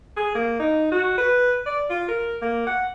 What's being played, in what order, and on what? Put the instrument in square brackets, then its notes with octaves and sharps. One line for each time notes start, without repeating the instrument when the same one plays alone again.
[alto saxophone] G#4
A#3
D#4
F#4
B4
D5
F4
A#4
A#3
F#5